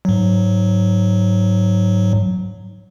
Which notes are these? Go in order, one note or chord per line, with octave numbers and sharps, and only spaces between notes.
G#2 F#3